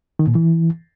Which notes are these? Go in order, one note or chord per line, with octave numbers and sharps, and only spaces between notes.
D#3
A#2
E3